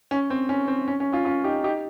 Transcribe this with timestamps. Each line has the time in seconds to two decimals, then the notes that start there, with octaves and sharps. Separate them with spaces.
0.11 C#4
0.30 C4
0.49 C#4
0.68 C4
0.88 C#4
1.00 C#4
1.12 C#4 F4
1.25 C#4 F4
1.44 D#4 G4
1.64 D#4 G4